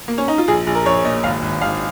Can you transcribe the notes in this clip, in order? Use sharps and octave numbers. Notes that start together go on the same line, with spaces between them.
A#3
C#4
D#4
F4
A#1 G#4
A#1
A#4
A#1 C#5
A#2 D#5
G#1 F5
G#1
G#1 F5